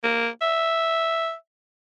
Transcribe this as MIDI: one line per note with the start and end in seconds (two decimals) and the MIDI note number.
0.04 0.28 58
0.42 1.33 76